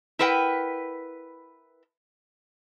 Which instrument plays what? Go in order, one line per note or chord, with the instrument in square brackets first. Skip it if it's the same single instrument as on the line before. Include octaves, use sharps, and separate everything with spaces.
[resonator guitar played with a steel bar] E4 A#4 B4 F#5 G5